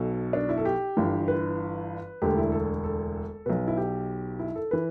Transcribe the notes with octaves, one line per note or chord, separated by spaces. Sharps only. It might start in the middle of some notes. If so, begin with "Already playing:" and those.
Already playing: B1 B2 A4
D4
E4
A4
G4
G1 G2 E3
B4
E1 D2 D3 G4
E4
A4
A4
B1 B2 B4
E4
G4
E4
A4
E3 B4